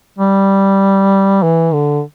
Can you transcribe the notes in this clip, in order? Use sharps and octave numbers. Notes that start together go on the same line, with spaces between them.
G3
E3
D3